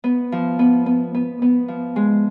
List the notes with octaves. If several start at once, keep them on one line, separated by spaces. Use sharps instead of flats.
B3
F3
B3
B3
B3
B3
F3
G#3